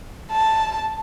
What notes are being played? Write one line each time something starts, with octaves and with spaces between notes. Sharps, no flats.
A5